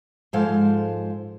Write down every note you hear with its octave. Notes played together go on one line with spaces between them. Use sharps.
G#2 F3 G#3 A4 C5 F5